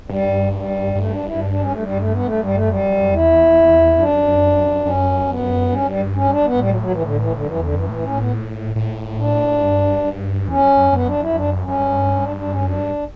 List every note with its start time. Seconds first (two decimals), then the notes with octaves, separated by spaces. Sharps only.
0.09 G2 G3
0.53 G3
0.95 G2 A3
1.10 D4
1.25 E4
1.39 D4
1.50 D4
1.61 C#4
1.72 A3
1.83 G3
1.97 A3
2.12 B3
2.25 A3
2.41 G3
2.54 A3
2.69 F#2 G3
3.12 E2 E4
3.98 F#2 D4
4.85 F#2 C#4
5.28 B3
5.72 G2 C#4
5.86 G3
6.15 C#4
6.31 D4
6.44 B3
6.59 A2 G3
6.69 F#3
6.81 F#3
6.91 E3
7.01 D3
7.17 E3
7.32 D3
7.45 F#2 E3
7.60 E2 D3
7.74 F#2 E3
7.89 A2 E3
8.03 C#4
8.17 B3
8.76 A2
9.18 D4
9.62 G2
10.49 E2 C#4
10.63 F#2
10.77 F#2
10.92 F#2 B3
11.06 D4
11.21 E4
11.35 D4
11.64 F#2 C#4
11.79 G2
12.22 D4
12.37 D4
12.50 C#4
12.65 F#2 D4
12.80 G2